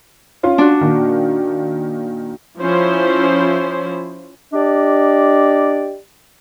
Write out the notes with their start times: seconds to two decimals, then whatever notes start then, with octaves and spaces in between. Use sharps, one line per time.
0.43 C#4 F4 C6
0.58 D4 F#4
0.81 A#2 D#3
2.61 F3 C#4 E4 C5
4.53 D4 G4 D5 D#5